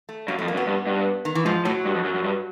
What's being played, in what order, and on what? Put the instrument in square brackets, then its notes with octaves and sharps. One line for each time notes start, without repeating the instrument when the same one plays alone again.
[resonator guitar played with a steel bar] A3
[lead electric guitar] F#2 [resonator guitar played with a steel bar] A#3
[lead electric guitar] F2 [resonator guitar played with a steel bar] A3
[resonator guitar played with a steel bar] A#3
[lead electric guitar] F#2
[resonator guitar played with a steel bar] B3
[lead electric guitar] G2
G2
[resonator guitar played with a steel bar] D#3
E3
[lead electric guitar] G#2 [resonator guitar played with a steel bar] F3
[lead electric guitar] A2 [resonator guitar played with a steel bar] F#3
[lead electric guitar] G2
F2
F#2
F#2
G2